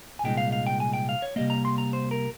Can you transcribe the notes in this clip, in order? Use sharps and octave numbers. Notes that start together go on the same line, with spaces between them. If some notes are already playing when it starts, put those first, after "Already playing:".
G#5
C2 A#2 G#3 D#4 G5
F5
F5
G5
G#5
G5
F5
C#5
C3 G3 A#3 D#5
A#5
C6
A#5
C5
A#4